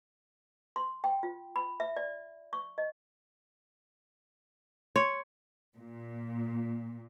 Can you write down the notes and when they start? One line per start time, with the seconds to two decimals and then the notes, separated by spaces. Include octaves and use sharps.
0.76 C6
1.04 G5
1.23 F4
1.56 B5
1.80 E5
1.97 D5
2.53 C#6
2.78 D#5
4.96 C#5 C6
5.78 A#2